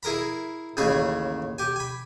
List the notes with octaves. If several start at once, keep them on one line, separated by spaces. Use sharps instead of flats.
E4 G#4 A#4 A#5 B5
A1 D#2 C#3 C#4 G#4 B5
G4 G#5
G#5 B5